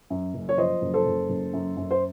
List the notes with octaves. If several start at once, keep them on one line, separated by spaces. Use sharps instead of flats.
F#2
F#1
C#5
F3 C5 D#5
F#1
A4 C5
F#1
F#1
F#2
F#2
C5